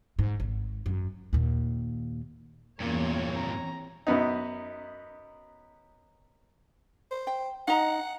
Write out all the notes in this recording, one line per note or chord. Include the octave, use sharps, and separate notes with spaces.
G#2
G#1
F#2
D#2 A#2
E2 G2 A#2 A#3 C#4 C#5
C4 A#5
F#2 B3 D#4
C5
G5
D#4 D#5 F#5 A#5